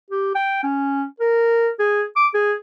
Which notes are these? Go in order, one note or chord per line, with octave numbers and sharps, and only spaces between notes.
G4
G5
C#4
A#4
G#4
D6
G#4